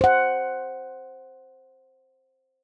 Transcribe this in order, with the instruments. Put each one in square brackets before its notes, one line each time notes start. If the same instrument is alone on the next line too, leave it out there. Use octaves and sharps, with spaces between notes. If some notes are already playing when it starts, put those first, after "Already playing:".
[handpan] C5 F#5